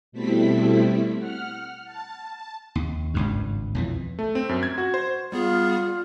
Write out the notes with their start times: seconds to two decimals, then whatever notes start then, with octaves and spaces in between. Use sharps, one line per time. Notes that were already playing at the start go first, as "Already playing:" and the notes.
0.12 B2 G3 A3 C4 E4 B6
1.17 F#5 F6
1.84 A5
2.75 D#2
3.14 G#1 C#2 G2
3.75 B1 F2 E3
4.19 A3
4.35 C4
4.49 F#2
4.63 G#6
4.78 F#4
4.94 C5
5.32 G3 B3 F4 G#4